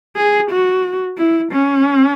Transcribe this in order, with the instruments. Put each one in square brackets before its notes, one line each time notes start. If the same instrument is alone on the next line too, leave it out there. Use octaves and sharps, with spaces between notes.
[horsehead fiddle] G#4
F#4
E4
C#4